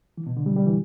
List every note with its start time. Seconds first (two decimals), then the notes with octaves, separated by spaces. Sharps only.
0.17 E3
0.27 B2
0.37 D3
0.46 G3
0.57 G3
0.66 E3